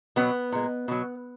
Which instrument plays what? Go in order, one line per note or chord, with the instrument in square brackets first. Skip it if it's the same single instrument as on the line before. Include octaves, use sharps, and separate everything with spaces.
[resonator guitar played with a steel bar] B2 F#3 B3
A#2 G#3
B2 F#3